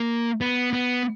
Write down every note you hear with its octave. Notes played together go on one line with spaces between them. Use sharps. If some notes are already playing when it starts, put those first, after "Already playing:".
Already playing: A#3
B3
B3